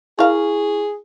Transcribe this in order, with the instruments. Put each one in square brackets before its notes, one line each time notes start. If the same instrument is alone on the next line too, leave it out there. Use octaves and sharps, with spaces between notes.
[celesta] E4 C#6 [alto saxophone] G#4 [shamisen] A#4 F5